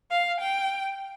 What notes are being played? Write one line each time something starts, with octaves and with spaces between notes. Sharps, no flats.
F5
G5